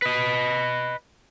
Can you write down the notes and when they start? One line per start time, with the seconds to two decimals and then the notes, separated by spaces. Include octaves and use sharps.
0.02 B4 D#5